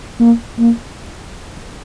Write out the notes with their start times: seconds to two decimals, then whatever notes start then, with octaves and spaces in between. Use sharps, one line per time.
0.20 A#3
0.59 A#3